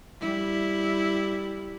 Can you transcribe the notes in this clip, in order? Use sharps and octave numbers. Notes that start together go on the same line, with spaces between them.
G3 E4